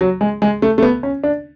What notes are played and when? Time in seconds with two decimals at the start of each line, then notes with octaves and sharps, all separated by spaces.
0.01 F#3
0.21 G#3
0.42 G#3
0.62 A3
0.78 A3
0.83 B3
1.03 C#4
1.24 D4